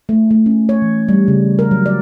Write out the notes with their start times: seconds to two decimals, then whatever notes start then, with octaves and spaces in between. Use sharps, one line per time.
0.09 A3
0.31 A3
0.46 C#4
0.69 C#5
0.82 E3
1.09 G3
1.28 C#3
1.59 A#4
1.71 F#3
1.86 D5